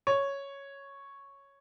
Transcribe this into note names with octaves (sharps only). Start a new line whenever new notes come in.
C#5